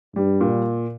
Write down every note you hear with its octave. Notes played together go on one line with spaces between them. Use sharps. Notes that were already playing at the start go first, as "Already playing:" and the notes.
G2 G3
A#2